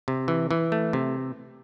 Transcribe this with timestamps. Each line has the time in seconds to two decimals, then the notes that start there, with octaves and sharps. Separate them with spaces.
0.08 C3
0.28 E3
0.51 E3
0.72 A3
0.93 C3